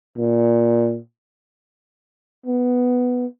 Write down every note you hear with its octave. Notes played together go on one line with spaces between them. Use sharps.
A#2
B3